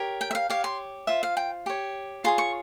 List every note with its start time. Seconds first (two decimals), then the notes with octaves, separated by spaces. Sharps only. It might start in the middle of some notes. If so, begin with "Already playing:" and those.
Already playing: G4 A#4 C#5
0.21 G5
0.31 E5
0.35 F5
0.50 G4 C#5 F5
0.64 C6
1.07 F4 C5 E5
1.23 F5
1.37 G5
1.66 G4 C#5
2.24 F4 G#4 C#5 C6
2.38 C#6